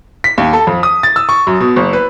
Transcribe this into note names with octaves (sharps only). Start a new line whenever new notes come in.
B6
D#2
A4
F2
D#6
A6
E6
C#6
F#2
B2
F#1
B4